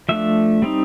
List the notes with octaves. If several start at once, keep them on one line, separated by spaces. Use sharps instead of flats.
F3 A3 D4 E5
G3 C4 D#4